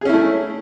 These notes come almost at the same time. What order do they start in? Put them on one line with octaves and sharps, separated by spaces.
G#4 C#4 E4 A3